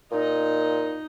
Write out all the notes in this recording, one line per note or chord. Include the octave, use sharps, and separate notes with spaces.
A#2 D#4 D#5